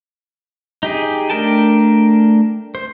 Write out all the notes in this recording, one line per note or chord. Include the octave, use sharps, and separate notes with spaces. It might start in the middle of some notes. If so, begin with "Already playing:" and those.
D#4 G4 G#4
A3 D4 A#4 G5 A5
C5